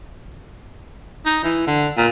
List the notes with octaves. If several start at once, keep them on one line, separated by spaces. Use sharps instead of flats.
D#4
E3
D3
A#2